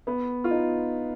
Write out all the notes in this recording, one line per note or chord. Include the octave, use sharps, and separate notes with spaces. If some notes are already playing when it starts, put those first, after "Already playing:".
B3
F4
D#4